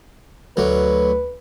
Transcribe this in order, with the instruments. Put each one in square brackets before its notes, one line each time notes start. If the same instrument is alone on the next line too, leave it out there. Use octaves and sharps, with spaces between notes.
[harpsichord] D2 F#3 [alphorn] B4